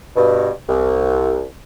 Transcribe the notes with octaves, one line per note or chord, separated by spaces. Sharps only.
G2 B2
C2